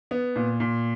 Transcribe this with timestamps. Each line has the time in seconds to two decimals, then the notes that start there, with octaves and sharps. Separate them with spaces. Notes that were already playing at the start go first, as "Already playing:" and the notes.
0.11 B3
0.36 A#2
0.60 A#2